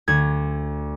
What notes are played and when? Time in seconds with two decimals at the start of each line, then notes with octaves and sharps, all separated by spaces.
0.08 D2 G#6